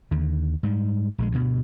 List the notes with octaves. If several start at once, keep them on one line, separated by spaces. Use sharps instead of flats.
D#2 D3
G#2 G3
A#1 D#3 G#3
D2 G2 B2